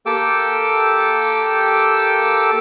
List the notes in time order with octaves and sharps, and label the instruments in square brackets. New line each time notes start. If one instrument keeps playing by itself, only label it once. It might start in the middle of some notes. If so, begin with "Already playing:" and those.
[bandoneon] A#3 G4 A4 G5 D6 E6